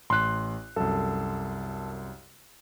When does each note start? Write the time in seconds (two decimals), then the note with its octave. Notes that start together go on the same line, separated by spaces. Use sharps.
0.10 A1 C6 F#6
0.76 C2 F#2 A4